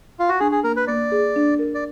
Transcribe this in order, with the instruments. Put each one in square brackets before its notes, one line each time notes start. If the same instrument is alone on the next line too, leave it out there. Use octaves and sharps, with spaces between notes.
[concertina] F4
F#4
[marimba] D4 [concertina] G#4
[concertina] G#4
[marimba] A#3 [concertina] A#4
[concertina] B4
[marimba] A#3 [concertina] D5
[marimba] G#4
D4
A#4
[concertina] D5